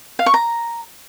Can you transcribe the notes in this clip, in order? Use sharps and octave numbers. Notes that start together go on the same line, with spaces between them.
F5
C#6
A#5